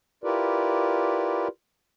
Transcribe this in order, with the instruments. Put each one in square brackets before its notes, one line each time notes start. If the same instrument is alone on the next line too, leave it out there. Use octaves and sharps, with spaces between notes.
[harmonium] E4 F4 G4 A#4 B4 D5